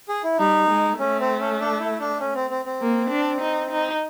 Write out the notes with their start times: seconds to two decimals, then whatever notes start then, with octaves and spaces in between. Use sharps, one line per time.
0.09 G#4
0.24 E4
0.38 G3 D#4
0.69 G#3
0.99 A3 C#4
1.20 C4
1.40 C#4
1.60 D4
1.80 E4
2.00 D4
2.20 C#4
2.35 C4
2.50 C4
2.65 C4
2.81 A#3
3.10 D4
3.41 D#4
3.71 D#4